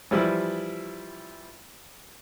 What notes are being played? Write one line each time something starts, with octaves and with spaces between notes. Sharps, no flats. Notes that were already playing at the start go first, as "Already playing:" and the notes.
E3 F3 G3 E4